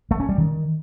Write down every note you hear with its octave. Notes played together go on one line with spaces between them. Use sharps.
A3
C#4
G3
D#3